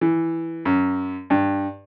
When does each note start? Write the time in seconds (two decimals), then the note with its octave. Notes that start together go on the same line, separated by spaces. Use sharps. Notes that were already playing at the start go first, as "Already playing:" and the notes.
0.01 E3
0.65 F#2
1.30 G2